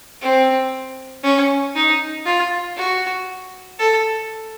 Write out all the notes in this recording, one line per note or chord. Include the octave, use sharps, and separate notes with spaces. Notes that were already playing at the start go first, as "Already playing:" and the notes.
C4
C#4
D#4
F4
F#4
A4